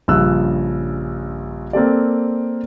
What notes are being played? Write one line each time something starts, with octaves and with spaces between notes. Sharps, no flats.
A#1 G2 C#3 E6 F#6
A#3 C4 A4 D5